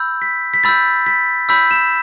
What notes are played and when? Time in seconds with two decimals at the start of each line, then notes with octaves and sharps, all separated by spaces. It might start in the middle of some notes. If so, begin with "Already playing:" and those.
Already playing: B5 E6 G6
0.22 B6
0.54 B6
0.64 B5 E6 G6 A6
1.06 B6
1.49 B5 E6 G6 B6
1.71 E7